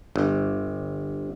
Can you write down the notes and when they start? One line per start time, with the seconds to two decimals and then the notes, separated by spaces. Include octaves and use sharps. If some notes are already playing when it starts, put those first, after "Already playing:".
0.16 G1